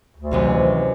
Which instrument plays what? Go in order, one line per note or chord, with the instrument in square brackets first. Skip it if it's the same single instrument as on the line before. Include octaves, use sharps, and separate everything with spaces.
[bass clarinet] D2
[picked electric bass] A#1 [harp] F#2 C3 D#3
[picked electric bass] E3